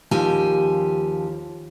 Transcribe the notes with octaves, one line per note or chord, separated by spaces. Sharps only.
D#2 F3 G4 G#5